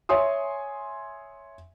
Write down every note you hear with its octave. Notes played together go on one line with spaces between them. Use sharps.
C#5 E5 G#5 C6 D#6